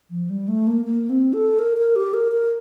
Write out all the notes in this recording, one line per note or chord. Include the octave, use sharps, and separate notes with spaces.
F3
G3
A3
A#3
A#3
C4
A4
A#4
A#4
G4
A#4
A#4